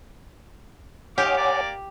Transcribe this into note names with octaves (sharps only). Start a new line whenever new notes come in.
D#3 G4 C#5 F5 F#5 G#5 D6
A#3 D5 D6